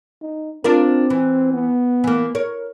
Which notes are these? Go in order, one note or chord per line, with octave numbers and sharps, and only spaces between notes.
D#4
C4 D4 F4 A#4
E3
B3
E3 A#3
A#4 C#5